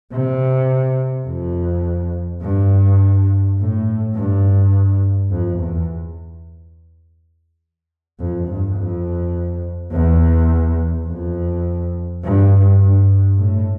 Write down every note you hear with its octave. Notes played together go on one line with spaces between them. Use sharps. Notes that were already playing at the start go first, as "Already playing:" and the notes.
C3
F2
G2
A2
G2
F2
E2
F2
G2
F2
E2
F2
G2
G2
A2